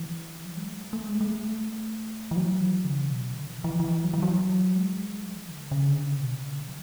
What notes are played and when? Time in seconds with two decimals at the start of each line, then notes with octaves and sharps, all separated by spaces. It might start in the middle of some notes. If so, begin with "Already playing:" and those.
Already playing: E3
0.45 F#3
0.57 G#3
0.68 A3
0.93 A3
1.09 G#3
1.21 G#3
1.24 A3
2.31 E3
2.36 F#3
2.61 E3
2.84 C#3
3.08 B2
3.32 D3
3.48 E3
3.64 E3
3.80 E3
4.04 F#3
4.14 E3
4.23 F#3
4.76 G#3
5.24 F#3
5.35 E3
5.48 D3
5.59 C#3
5.71 C#3
5.88 D3
6.03 C#3
6.20 B2
6.35 C#3
6.52 D3
6.67 F#3